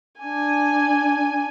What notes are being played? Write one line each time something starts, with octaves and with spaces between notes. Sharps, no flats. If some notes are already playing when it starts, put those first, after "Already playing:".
D4 G#5